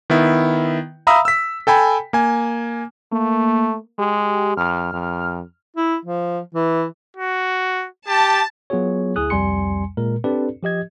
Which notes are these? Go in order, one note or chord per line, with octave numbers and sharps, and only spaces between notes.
D#3 B3 E4
E5 F5 A#5 B5 D#6 E6
E6 B6
A4 G5 G#5 B5
A#3 G#5
A3 A#3
G#3 G4
F2 F6
F2
E4
F3
E3
F#4
G4 A5
F#3 B3 F4 F#4 G#4 C#5
D2 E4 G#4 D#6 F#6
C2 F2 G3 G#5 C6 C#7
A#2 G#3 A#4
C4 D4 G4 A4 B4 D5
F3 G4 D#5 G#6